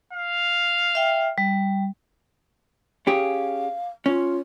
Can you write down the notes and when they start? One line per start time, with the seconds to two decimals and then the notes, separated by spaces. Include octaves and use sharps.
0.13 F5
0.95 E5 G5
1.38 G3
3.07 C#4 G4 G#4 F5
4.06 C#4 F4